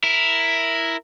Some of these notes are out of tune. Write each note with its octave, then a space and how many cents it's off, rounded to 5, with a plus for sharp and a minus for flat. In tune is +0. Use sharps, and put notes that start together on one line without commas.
E4 +0 A#4 +0